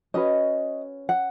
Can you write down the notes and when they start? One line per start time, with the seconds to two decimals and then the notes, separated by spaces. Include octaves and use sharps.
0.14 C#4 F#4 B4 D#5
1.09 F#5